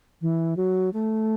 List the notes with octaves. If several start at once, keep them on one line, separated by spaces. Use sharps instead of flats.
E3
F#3
A3